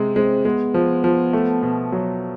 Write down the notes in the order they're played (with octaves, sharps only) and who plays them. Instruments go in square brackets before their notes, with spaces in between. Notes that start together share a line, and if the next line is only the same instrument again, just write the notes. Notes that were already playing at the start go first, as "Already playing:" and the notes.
Already playing: [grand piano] C3 G#3
[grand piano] G#3 [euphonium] C4
[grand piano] G#3 [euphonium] B3
[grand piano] F3
F3
A3
B2
F#3